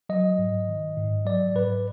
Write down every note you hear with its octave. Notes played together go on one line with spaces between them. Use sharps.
F#3 D#5
G#2
D#3
G#2
F#3 D5
G#2 B4